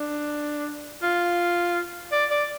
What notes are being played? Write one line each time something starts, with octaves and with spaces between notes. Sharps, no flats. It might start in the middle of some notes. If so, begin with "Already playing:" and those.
Already playing: D4
F4
D5
D5